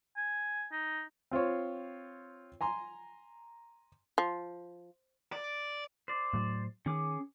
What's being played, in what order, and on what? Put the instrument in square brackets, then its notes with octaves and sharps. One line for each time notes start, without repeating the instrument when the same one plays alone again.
[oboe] G#5
D#4
[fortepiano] C4 F4 C5 C#5
G#5 A#5 C6
[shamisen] F3
[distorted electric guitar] D5
[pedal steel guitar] C5 D5
[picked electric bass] A2 F#3
[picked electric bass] D#3 [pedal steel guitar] C#4 G#4 D6